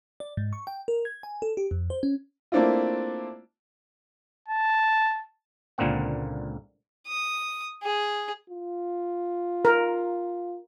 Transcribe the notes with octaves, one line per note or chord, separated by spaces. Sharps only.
D5
G#2
C#6
G5
A#4
G#6
G#5
A4
G4
F2
C5
C#4
A3 A#3 C4 D4 E4 F4
A5
C#2 A#2 D3 A#3 C4 F#5
D#6
G#4
F4
A#4